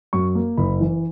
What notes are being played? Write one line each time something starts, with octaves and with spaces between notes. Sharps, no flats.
F#2 C#6
A#3
F#1 B5
E3